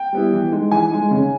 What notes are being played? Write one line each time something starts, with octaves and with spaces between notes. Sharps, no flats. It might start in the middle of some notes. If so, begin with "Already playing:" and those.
Already playing: G5
G3 B3 E4
E3
G#3 D#4
E3 G#5
G#3 D#4
C#3